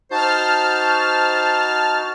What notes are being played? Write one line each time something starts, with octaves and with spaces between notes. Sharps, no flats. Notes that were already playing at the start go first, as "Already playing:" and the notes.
D#4 F#4 C5 A5 F6